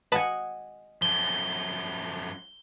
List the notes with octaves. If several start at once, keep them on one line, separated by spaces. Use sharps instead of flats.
B4 D#5 F#5 G#5 A5
F#2 F3 G7